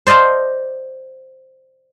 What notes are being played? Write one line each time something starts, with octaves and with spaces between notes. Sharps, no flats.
C5 D5 D#5 F5 A5